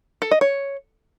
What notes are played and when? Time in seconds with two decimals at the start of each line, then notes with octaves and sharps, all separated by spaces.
0.22 A4
0.31 D#5
0.41 C#5